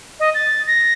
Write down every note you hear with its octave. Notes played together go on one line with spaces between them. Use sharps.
D#5
A6
A#6